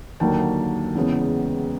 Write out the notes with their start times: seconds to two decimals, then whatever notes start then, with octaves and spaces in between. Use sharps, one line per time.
0.20 D#2 D3 F#3 A#3 G5 A5
0.95 E2 C#3 E3 G#3 B3